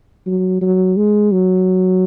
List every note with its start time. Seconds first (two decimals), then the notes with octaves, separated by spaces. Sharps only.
0.26 F#3
0.61 F#3
0.97 G#3
1.32 F#3